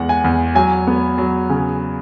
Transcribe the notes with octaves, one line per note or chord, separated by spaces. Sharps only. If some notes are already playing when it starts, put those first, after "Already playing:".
Already playing: E2 G#3 F#5
G#5
E2
F#3 G#5
B3
F#3
C#3